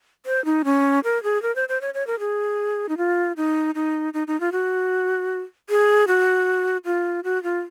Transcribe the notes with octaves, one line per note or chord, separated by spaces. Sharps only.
C5
D#4
C#4
A#4
G#4
A#4
C5
C5
C#5
C#5
A#4
G#4
D#4
F4
D#4
D#4
D#4
D#4
F4
F#4
G#4
F#4
F4
F#4
F4